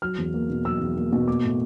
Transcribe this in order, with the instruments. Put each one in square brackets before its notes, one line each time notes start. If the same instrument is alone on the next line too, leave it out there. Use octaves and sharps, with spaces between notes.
[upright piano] F#3 F6
E2
A#3
B2
F#3 E6
E2
A#3
B2
A#3 D6
A2